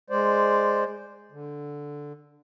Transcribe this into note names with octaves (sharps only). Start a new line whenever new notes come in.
G#3 C5 D5
D3